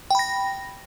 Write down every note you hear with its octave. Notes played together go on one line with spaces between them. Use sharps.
G5 B5 A#6